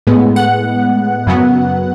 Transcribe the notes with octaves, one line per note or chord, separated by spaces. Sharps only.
A2 G#3 B3
F#5
F#2 C#3 F#3 B3